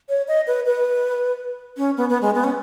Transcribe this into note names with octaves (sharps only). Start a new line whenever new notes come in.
C#5
D#5
B4
B4
C#4
B3
B3
G#3
B3
C#4